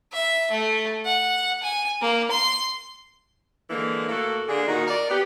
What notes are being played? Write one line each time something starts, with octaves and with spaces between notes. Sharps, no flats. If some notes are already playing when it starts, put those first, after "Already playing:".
E5
A3
F#5
G#5
A#3
C6
D3 E3 G#3 A#3
A2 A#3 F#4 A4
D3 A#3 D4 G#4
A#2 D#3 D#4 F#4
A#4 D5
B3 G4